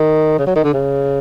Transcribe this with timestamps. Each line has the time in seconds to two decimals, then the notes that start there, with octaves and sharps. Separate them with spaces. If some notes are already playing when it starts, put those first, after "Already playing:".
Already playing: D#3
0.39 C#3
0.47 F#3
0.56 D#3
0.64 D3
0.73 C#3